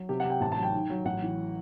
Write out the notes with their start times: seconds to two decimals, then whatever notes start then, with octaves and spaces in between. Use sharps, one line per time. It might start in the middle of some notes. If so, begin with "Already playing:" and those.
Already playing: F#3
0.09 C3 G4
0.20 F#5
0.24 C3
0.30 G5
0.41 A1 A5
0.52 A5
0.57 F#3
0.63 G5
0.74 D#3
0.90 F#3
1.05 A1 F#5
1.22 E3